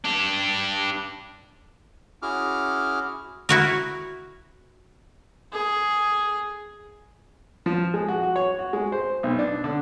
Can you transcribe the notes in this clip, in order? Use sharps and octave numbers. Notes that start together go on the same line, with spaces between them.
D4 G4
C#4 E4 F#4 G#4 D6 F6
E4 F#4 A#4
G#4
F3
G#3
F#4
F#4
C#5
F#4
G#3
C5
B1
D4
D3